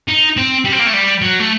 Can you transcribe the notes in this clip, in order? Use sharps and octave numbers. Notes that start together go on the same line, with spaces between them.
D#4
C4
G3
C4
A#3
A3
G3
F#3
A3